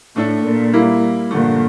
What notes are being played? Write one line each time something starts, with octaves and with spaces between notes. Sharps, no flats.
A2 A3 D4 A4
A#2
G3 A#3 E4
G2 A#2 D3 F3 A3